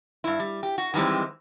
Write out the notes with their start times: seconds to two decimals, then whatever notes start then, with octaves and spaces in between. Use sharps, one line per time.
0.24 G2 E4
0.39 G3
0.63 G4
0.78 F#4
0.94 D#3 E3 G3 G#3 C4